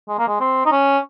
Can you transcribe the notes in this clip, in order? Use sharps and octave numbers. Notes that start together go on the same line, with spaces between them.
G#3
A#3
G#3
C4
D#4
C#4